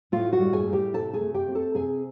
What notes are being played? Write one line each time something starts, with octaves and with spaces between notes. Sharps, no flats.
A2 F4 F5
F#4 F#5
G3
G#4 G#5
A2
G4 G5
C3 A4 A5
G#4 G#5
A3
G4 G5
C4
A4 A5
C3 G#4 G#5